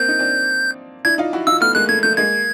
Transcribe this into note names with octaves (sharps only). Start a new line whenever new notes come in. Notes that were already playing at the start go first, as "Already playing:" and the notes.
Already playing: A#3 C4 G6
D#4
C4 D4
D4 E4 G#6
D#4 F4
E4 F#4
D#4 F4 E6
A3 B3 F6
G#3 A#3 F#6
A3 G#6
A3 G6
G#3 A#3 G#6